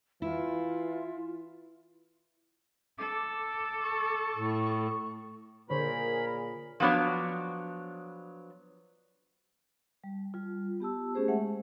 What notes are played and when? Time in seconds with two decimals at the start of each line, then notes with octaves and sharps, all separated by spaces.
0.22 E3 E4 F4
2.98 A4 D6
3.83 C#6
4.37 A2
5.70 A#2 D3 G#4 A#4 C5 C#5 B5
6.80 F3 F#3 B3 D4 C#5
10.04 G3
10.34 G3 F4
10.80 B3 G4 A5 E6
11.15 A3 C#4 G4 G#4 C5
11.28 G#3 A3 E5 F#5